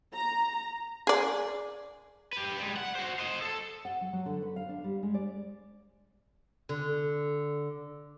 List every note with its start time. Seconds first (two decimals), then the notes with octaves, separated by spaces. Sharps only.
0.13 A#5
1.07 G#4 D5
2.33 G4 B4
2.59 G3 G#3
2.76 F#5
2.95 F#4 C5
3.19 C5 D#5
3.42 A4
3.85 F#5
4.01 F#3
4.13 F#3
4.26 D3
4.42 B4
4.56 F5
4.69 D4
4.84 G3
5.03 G#3
5.14 D5
6.69 D3